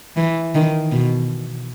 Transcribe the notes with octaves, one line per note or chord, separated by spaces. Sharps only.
E3
D#3
B2